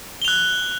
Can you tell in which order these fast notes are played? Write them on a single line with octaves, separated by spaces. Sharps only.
G7 F7 F#6